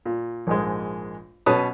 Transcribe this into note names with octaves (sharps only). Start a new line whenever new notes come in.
A#2
A#1 G#2 G#3
B2 F#3 C#4 B4 A5 D#6